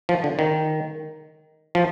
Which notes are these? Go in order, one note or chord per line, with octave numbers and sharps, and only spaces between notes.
F3
D3
D#3
F3